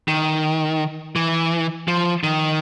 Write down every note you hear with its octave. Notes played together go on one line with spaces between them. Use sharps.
D#3
E3
F3
D#3